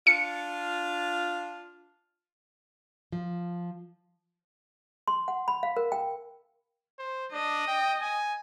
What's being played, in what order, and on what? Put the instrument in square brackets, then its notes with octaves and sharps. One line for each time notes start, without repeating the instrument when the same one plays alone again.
[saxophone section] D4 F4 [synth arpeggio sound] C#7
[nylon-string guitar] F3
[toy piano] C6
F#5
B5
F5
A#4
G5
[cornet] C5
[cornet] D4 [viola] D#5
[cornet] G5
G#5